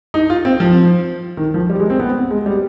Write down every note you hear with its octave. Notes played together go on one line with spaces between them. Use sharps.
D#4
F4
C4
F3
D#3
F3
G3
G#3
C4
B3
G#3
G3